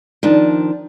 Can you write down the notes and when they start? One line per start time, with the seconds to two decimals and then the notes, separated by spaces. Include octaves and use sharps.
0.23 D#3 F3 D4